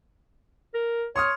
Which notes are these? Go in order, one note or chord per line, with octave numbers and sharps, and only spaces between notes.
A#4
C#5 C6 D#6 F6